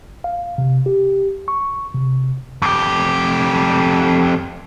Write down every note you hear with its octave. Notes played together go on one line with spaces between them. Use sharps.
F5
C3
G4
C#6
C3
F2 G4